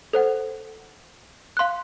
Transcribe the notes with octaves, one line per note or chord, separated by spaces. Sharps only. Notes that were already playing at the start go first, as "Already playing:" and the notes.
A4 C5 F#5
F5 C6 F#6